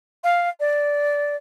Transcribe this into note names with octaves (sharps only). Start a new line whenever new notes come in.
F5
D5